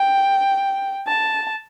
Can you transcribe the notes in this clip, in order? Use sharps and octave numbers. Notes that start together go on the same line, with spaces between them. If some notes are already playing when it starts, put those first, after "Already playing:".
Already playing: G5
A5